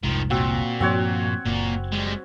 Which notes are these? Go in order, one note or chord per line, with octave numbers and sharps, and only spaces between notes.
F1 C2 G#2 D#3 F3
A#2 C4 F#4
G2 F3 A#3 C4 F#4 C#5
F#1 A#2 A#3
G3 G#3